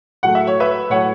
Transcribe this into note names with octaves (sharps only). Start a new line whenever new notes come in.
A2 F#3 A3 F#5
E5
C#5
B4 E5
A2 F#3 A3 C#5 F#5